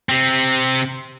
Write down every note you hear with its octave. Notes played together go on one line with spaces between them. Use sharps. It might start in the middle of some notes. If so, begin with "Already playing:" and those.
C3 C4